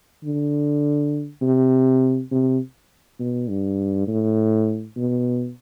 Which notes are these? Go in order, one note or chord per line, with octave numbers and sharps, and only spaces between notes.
D3
C3
C3
B2
G2
A2
B2